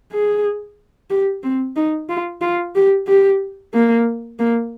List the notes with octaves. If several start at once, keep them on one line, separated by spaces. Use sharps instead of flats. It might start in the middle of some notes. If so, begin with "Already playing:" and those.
G#4
G4
C4
D#4
F4
F4
G4
G4
A#3
A#3